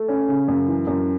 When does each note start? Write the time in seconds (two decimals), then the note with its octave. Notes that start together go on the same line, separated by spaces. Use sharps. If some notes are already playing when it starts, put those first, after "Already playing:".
Already playing: A3
0.08 C#4
0.28 C#3
0.48 F#2
0.68 E3
0.87 F#2